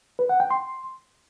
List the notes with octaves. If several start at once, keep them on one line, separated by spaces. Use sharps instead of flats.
B4
F#5
G5
C6